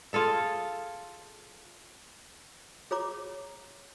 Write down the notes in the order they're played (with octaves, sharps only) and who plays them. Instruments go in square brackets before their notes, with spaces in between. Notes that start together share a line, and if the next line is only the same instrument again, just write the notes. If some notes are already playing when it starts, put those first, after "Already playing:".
[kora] F4 G#4 A4 F5
[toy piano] G#4 C#5 A#5 D6